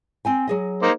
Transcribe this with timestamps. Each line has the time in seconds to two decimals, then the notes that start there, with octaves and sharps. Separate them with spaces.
0.25 C4 G5 G#5
0.48 F#3 G#4 D#5
0.82 A#3 D#4 C5